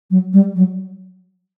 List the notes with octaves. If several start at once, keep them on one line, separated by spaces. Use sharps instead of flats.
F#3
G3
F#3